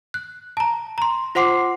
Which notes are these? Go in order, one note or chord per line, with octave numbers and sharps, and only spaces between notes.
F#6
A5 A#5
A#5 C6
F4 C5 F#5 C6 D6 C7